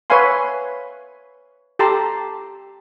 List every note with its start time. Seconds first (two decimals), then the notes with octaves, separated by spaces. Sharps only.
0.10 B4 C#5 E5 F5 G#5 C6
1.79 G4 A4 A5 A#5 C6